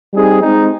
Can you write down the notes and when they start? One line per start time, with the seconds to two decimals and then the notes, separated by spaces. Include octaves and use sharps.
0.13 G3 C4 D#4 G#4
0.42 G#3 C4 D#4